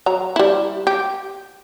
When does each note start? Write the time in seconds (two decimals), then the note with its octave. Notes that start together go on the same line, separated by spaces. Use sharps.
0.06 F#3 A#5
0.36 G3 E4
0.87 G4